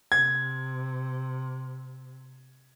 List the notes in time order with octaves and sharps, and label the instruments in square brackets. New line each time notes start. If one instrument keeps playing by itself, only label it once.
[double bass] C3 [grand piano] G#6